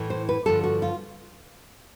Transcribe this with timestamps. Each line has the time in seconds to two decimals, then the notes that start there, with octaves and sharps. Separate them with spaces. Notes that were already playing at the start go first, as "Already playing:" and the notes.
Already playing: A2 E3
0.10 C5
0.29 B4
0.46 G2 D3 F3 A4
0.64 F#4
0.82 F4